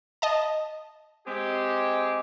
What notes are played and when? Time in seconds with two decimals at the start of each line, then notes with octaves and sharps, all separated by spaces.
0.22 D#5 A5
1.27 G#3 C4 G4